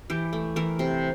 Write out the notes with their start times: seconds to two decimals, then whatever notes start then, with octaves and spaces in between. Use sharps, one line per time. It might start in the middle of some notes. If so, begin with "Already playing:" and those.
0.10 E3 G4
0.33 A3
0.56 E3 A#4
0.79 C3